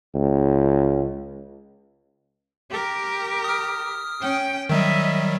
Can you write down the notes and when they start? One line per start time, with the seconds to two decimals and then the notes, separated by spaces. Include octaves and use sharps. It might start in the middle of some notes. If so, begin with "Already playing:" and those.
0.15 C#2
2.70 G4 A#4
3.44 D#6 F6
4.20 C#4 G5
4.69 D#3 F#3 G3 D#5 E5